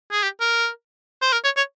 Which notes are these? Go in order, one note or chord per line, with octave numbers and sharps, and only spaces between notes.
G#4
G4
A#4
C5
A#4
C#5
C#5